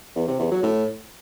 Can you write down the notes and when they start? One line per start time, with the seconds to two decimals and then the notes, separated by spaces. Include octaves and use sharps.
0.16 E2
0.28 C3
0.40 E2
0.51 F#3
0.63 A2